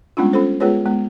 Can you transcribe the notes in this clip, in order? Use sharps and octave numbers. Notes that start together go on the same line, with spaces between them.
G3 G#3 B3 C#4 D4 F4
C#4 F4 A4 C5
G#3 B3 F4 G#4 B4 C#5
G#3 B3